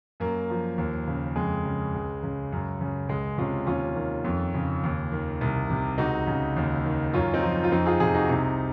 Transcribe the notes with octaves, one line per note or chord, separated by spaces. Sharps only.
F#2 A#3
F3
D#2
C#3
F2 G#3
C#3
C#2
C#3
F#2
C#3
C#2 G#3
C3 C#4 F4
D#2 C#4 F4
D#3
F2
C#3
D#2
D#3
C2
C3
C#2 D#4 F#4
C#3
D#2
D#3
F#2 C#4 F4
C4 D#4
F3
F4
F2 C4 D#4
F4 G#4
C3 F4 G#4
D#4 F#4
C2 C4 D#4